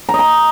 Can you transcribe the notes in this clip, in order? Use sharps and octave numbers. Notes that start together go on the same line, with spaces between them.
A#5
D#5
A#5